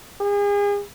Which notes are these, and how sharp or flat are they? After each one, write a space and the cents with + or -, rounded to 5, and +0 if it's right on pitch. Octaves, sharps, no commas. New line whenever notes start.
G#4 -35